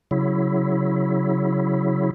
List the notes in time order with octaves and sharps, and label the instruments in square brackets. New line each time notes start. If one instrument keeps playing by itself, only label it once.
[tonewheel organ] C#3 F#3 E4